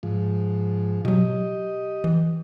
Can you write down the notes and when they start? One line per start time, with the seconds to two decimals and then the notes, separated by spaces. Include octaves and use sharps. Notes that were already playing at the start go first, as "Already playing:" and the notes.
0.03 G#2 F3
1.05 B2 F#3 G4 D#5
2.04 E3